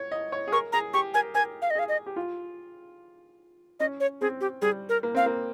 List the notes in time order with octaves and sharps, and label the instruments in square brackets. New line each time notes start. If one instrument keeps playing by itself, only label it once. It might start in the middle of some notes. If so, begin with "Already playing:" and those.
Already playing: [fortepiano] C#5
D#5
C#5
G#4
[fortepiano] A#4 [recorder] C#6
[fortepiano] G#4 [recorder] A#5
[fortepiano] G4 [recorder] C#6
[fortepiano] A#4 [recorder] G#5
[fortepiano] A#4 [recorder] G#5
[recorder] F5
D#5
[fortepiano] G#4 [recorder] F5
[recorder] D#5
[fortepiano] G4
F4
[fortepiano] C#4 [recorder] D#5
[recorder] C#5
[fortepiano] C4 [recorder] G#4
[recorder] G4
[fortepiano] G3 [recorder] G#4
[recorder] A#4
[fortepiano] A#3
[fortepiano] C4 [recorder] F5
[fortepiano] A#3